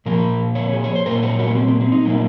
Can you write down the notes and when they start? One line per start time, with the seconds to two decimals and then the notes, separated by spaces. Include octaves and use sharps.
0.06 A#2 F3 A#3 A#4
0.55 C#5
0.73 G#4
0.84 C#5
0.95 C5
1.06 A#2 F#3 A#3 A#4
1.23 C#5
1.39 F#4
1.48 A#3
1.55 C4
1.68 A#3
1.81 C4
1.92 D#4
2.05 A#2 F#3 A#3